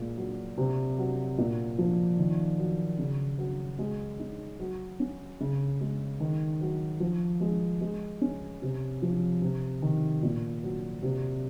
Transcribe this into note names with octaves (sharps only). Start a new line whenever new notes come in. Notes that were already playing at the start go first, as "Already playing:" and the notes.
Already playing: A#2 G#3
F#3
C3
F#3
A#2
F3
D#3
F#3
C#3
F#3
G#3
D#4
F#3
C#4
C#3
G#3
D#3
F#3
F3
G#3
G#3
C#4
C3
F3
C3
D#3
A#2
F#3
C3